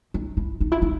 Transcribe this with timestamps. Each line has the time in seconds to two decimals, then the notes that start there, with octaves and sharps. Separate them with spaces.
0.14 D#4
0.37 E4
0.60 D#4
0.72 E4
0.82 D#4